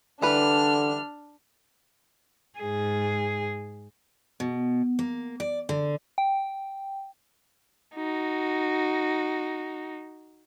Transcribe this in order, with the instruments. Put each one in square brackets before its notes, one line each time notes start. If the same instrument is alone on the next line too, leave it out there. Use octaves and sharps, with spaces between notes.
[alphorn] D3 [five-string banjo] E3 G3 B4 [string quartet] D4 [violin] F6
[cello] G#2 G#4
[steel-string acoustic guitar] B2
A#3
D5
D3
[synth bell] G5
[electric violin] D#4 F#4